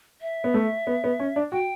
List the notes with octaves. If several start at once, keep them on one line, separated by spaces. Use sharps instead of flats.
E5
B3
A3
B3
B3
C#4
D4
F#4 G5